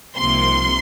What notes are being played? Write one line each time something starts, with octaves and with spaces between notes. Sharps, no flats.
C2 C3 F3 A#3 D#4 C6